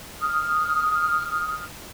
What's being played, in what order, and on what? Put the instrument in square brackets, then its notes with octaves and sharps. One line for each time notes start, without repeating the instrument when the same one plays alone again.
[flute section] D#6 F6